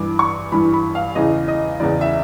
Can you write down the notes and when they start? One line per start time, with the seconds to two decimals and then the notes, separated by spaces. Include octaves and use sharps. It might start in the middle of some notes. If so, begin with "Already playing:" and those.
Already playing: G2 E3 D6
0.19 C#6
0.52 G2 E3 B5
0.74 B5
0.95 F5
1.15 E2 C#3 E3 D#5
1.48 D#5
1.80 E2 C#3 E3 D5
2.01 E5